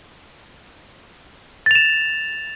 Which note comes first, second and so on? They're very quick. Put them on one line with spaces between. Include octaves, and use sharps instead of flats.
A6 F7 E7